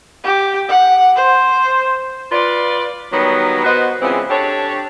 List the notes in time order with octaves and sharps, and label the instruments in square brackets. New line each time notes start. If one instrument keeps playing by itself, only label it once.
[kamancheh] G4
F#5
C5
[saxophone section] F4 B4 D5
D#3 F#3 G3 B3 C#5
B3 F#4 B4 C5 D#5
C#3 E3 G#3 B3 C4 F4
D4 G4 A4 C#5